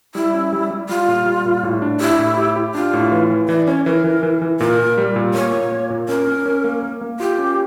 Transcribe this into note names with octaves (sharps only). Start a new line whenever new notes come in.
G3 E4
C#4
G3
G3
G3 F4
A#2
G3
A#2
A2
D4
E4 G4
A2
G4
G4
D4 F4
A2
E3
E3
E3 D5
C#4 C#5
E3 A#4
E3
E3
E3
A#2 A#4
A#2
G3
A#2
A#3 C#5
A#2
A#3
A#2
C#4 A#4
C#4
C#4
A#3
A#3
A#3
F4 G4
C#4